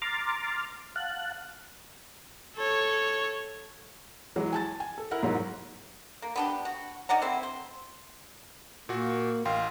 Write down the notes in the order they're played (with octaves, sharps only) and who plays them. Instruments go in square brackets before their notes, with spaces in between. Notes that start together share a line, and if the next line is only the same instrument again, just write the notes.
[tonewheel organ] A#5 C6 D6 F6 A6
F5 F#5 A5 F#6
[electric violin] A4 C#5
[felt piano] E3 F#3 G#3
G#5 A5 A6
G#5
A4
E4 A#4 F#5
G#2 F#3
[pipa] A#3
B3 D4 G4
F#4
D#3 D5 F#5 A#5
C4 E4
C5
[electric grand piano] A#2 F#4 [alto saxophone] A#3
[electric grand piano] A1 G5 C6 [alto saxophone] F5